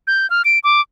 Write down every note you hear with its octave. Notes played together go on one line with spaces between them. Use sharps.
G6
F6
D7
D6